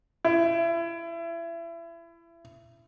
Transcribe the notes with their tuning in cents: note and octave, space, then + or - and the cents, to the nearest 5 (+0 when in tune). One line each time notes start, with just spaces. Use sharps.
E4 +30